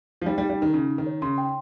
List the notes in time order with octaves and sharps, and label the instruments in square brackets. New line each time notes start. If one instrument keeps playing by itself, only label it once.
[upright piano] F3
[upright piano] G3 [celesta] D#4
[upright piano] G3
[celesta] D#4
[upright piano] G3
[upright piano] D#3 [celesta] D#4
[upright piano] C#3 [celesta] D#4
[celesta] D#4
[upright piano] D#3
[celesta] C#5
[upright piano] C#3 [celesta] C6
[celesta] G5